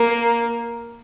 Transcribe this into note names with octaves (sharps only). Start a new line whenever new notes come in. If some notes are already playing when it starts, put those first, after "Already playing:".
Already playing: A#3